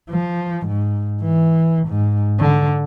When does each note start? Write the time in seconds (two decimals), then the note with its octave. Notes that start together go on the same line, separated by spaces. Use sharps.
0.10 F3
0.67 G#2
1.22 E3
1.88 G#2
2.40 D3